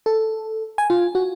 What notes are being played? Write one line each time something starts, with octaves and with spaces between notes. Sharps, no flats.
A4
G#5
F4
F#4